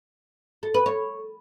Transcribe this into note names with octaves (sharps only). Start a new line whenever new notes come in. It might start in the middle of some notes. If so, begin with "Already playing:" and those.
A4
B4
C#5